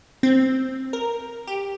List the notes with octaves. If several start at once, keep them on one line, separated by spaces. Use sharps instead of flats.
C4
A#4
G4